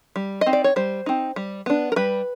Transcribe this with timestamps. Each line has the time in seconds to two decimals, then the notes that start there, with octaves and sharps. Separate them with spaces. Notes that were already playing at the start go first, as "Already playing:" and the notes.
0.16 G3
0.41 D#5
0.46 C4 D#4
0.53 D5
0.64 C#5
0.76 G3 C5
1.06 C4 D#4
1.36 G3
1.66 B3 D4
1.92 A#4
1.96 G3 B4